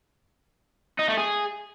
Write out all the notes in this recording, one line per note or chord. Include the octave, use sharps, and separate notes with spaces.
D#4
A3
G#4